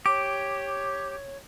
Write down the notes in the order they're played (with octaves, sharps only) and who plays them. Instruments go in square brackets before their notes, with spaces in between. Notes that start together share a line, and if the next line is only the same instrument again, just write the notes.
[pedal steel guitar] G4 [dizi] C#5 [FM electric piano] D6